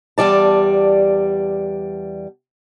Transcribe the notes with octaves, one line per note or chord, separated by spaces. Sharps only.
E2 G2 G3 D5 A5